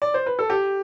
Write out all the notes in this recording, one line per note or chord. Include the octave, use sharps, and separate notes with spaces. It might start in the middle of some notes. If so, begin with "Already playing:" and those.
D5
C5
B4
A4
G4